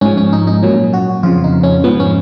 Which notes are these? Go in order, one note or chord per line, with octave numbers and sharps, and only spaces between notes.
G#2 F3 C#4
C#4
D#4
D#4
A#2 F#3 C#4
F#4
F2 C#3 F3 F4
D#4
C#4
G#2 F3 B3
C#4